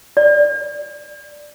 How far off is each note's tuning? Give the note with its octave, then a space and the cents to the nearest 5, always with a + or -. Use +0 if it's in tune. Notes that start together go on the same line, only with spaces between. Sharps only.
D5 +5